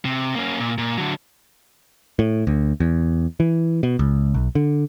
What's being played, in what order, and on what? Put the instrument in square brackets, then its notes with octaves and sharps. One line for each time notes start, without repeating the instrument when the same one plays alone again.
[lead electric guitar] C3
A#3 C#4
A#2
A#2
D3 F#3
[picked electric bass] A2
D2
E2
E3
B2
C#2
B1
D3